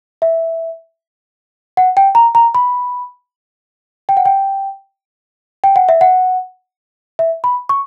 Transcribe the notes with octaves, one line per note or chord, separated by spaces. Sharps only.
E5
F#5
G5
A#5
A#5
B5
G5
F#5
G5
G5
F#5
E5
F#5
E5
B5
C#6